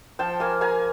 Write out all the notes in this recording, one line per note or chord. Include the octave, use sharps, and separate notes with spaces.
F3 G5 A5
A#3 G#5 A#5
A#3 G#5 A#5